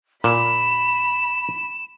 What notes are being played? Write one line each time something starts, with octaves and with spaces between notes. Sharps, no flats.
A#2 B5 E7